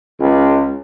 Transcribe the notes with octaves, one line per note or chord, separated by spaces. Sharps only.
C#2